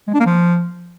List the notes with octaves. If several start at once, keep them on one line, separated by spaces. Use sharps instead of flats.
G#3
D4
A#3
F3